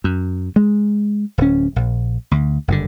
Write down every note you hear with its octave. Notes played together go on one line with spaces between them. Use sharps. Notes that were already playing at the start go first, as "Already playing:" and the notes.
F#2
G#3
D1 C#4
A#1
D2
F#1 G2 B2 D3